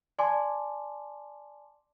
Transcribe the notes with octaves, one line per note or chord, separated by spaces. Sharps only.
D5 G#5 A5 C6 D6